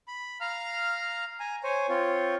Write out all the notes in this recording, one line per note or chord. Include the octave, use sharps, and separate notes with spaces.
B5
F5 A#5 F6
G#5 A#5
C5 C#5 G#5
C4 F4 C#5